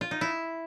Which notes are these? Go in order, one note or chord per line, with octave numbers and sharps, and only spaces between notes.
F4
D#4
E4